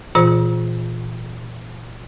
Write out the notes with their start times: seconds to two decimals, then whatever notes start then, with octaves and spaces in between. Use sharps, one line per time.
0.15 A#2 E3 F4 C5